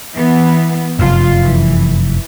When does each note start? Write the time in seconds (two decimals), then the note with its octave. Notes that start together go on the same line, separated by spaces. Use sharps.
0.14 E3 B3
0.99 F1 F#2 F4
1.42 E3